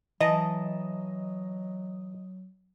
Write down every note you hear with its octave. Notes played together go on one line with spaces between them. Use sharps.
E3 F#3 D#5 A5 A#5